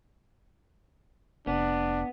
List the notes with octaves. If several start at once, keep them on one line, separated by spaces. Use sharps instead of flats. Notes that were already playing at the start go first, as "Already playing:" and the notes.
F1 B3 D4